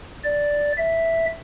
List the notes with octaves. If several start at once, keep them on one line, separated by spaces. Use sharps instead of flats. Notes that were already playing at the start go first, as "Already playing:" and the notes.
D5
E5